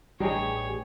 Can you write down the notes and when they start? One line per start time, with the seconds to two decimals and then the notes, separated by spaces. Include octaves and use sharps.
0.20 A1 G2 G3 D#4 G4 G#4 C#5